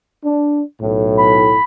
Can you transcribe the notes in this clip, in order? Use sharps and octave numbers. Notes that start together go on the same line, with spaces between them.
D4
B1 A2
B5